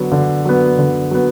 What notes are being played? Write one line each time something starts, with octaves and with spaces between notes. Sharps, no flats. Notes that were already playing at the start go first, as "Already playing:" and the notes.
Already playing: D3 F#3 B3
D3
F#3 B3
D3
F#3 B3